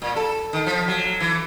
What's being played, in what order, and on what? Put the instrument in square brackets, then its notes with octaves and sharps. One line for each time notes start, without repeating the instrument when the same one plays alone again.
[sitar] A#2
A4
D#3
F3
F#3
E3